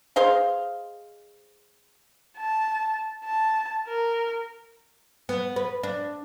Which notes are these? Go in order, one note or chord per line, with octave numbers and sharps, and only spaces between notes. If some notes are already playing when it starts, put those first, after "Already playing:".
G#4 C5 D#5 F5
A5
A5
A#4
B3
B4
D4